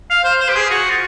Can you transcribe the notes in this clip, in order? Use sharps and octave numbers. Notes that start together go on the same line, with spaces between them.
F5
C5
C5
G4
G#4
F#4
F4